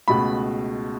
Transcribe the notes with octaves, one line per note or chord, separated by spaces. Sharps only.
C#2 B2 A3 B5